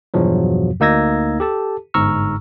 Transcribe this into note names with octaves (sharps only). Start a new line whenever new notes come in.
E2 G2 B2 F3 F#3
D2 A#3 D#4 E6 G#6 A#6
G4 A4 A5
G1 G#2 A#5 C#6 E6 F6